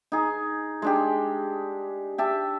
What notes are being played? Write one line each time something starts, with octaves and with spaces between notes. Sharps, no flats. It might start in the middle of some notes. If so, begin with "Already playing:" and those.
D#4 G#4
G#3 D4 G4
G4 E5 A5